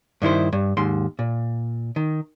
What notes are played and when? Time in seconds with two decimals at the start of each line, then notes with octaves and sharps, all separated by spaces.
0.22 G2 D#3 E4 C5
0.53 G2
0.77 D#2 G#2 C6
1.19 A#2
1.96 D#3